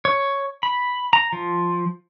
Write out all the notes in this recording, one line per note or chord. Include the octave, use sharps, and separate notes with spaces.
C#5
B5
A#5
F3